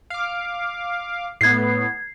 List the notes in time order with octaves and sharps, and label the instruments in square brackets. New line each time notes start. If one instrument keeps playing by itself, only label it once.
[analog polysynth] F5 D6
[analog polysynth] A2 B3 [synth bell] G#6 C7